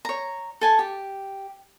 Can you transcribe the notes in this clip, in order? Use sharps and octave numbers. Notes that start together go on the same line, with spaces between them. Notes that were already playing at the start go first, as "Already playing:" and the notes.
C#5 A#5
A4 G#5 A5
G4